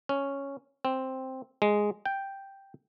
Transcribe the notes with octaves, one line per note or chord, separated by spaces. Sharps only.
C#4
C4
G#3
G5